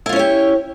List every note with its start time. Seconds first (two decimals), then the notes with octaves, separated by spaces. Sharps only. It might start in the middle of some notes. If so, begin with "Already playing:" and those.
0.06 E4
0.09 F4
0.13 C#4
0.16 C#5
0.19 G4